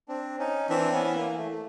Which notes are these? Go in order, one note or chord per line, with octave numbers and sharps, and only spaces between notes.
C4 D4
C#4 D#4
E3 C4 D4
B3 C#4
B3
A#3
A3
A3